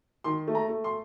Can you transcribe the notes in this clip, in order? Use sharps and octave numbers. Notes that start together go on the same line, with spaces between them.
D#3 C6
A3
A#5
A3
C6